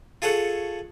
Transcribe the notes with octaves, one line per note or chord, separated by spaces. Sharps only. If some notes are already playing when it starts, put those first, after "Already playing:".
F4 G#4 A4 C#5 F#5